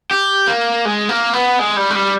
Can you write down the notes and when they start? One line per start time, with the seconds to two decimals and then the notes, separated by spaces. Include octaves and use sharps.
0.11 G4
0.47 A#3
0.85 G#3
1.09 A#3
1.33 B3
1.59 G#3
1.77 G3
1.90 G#3
1.95 G3